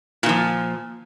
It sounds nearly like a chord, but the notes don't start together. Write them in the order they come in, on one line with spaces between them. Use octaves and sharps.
A#2 D#3 F3